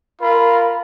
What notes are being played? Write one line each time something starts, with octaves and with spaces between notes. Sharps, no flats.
F4 A#4 B5